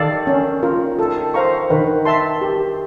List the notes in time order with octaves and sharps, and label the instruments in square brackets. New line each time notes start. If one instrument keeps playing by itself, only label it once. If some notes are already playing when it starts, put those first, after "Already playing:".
Already playing: [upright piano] D#3 [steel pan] A4 D5 F5
[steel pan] C#4
F4 A#4
A4
C5 F5 A#5 C#6
[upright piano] D#3 [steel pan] B4
[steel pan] E5 A5 C6
G4